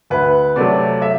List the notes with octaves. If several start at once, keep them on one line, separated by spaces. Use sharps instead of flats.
D2 B4
C3 F#3 A3 D5
E5